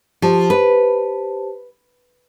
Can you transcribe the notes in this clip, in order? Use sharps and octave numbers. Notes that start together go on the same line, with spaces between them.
F3 G4 C5 A5
B4